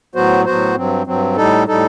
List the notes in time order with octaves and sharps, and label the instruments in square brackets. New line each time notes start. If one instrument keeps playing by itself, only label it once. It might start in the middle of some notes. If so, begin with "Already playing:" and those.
[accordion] A2 F#3 B3 F#4 C5
A2 F#3 B3 F#4 C5
G2 F#3 C4
G2 F#3 C4
A2 G3 D#4 A4
A2 G3 D#4 A4